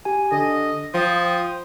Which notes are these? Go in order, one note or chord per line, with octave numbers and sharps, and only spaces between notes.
G4 G#5
D3 A4 D#5
F3 G5 C6 D#6